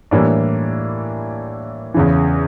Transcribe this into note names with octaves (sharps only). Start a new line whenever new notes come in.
A2 E3 G3 A#3 D4
E2 C#3 E3